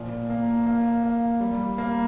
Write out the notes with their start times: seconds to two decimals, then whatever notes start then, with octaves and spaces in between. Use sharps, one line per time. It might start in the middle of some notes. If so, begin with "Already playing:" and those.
Already playing: A#2 F3
0.30 A#3
0.66 A#3
1.03 A#3
1.40 G3
1.78 A#3